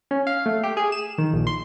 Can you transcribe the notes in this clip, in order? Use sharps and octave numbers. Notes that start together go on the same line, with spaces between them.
C#4
F5
A3
G4
G#4
E7
D#3
A#1
C6